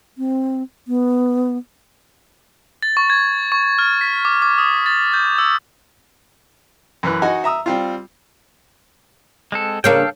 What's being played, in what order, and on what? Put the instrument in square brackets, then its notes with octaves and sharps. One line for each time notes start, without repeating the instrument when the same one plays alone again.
[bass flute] C4
B3
[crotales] A6
C#6
G#6
C#6
F6
B6
D6
D6
D#6
A6
G6
E6
[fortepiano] F#2 E3 B4 F#6
D#4 F#4 D#5 F#5 G#5
E5 A#5 D#6 E6
G3 C4 F4
[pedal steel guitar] G#3 C4 A4
[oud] C#3 A#3 D4 [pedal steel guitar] A4 F5 G5